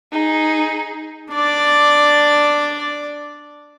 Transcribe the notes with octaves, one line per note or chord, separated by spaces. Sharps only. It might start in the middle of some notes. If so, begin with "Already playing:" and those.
D#4 G#4
D4 D5